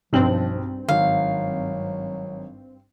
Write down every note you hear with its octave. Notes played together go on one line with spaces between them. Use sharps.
B1 G2 F3 C4 F#7
G#1 F#3 F5